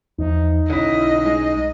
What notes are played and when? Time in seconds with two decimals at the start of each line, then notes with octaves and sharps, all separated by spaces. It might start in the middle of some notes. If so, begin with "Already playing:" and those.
0.19 E2 F3 D#4
0.70 B1 D3 C#4 E4 D#5
1.26 G#3